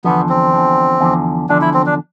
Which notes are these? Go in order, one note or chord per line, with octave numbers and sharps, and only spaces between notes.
E2 D3 F3 B3
C4
E2 D3 F3
E2 D3 F3
E2 D3 F3 D4
E4
C4
D4